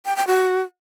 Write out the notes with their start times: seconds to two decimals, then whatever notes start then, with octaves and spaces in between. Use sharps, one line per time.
0.06 G5
0.16 G5
0.27 F#4